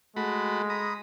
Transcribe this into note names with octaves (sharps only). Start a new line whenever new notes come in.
G#3 A3 F#4 B5
A#5 B5 D#6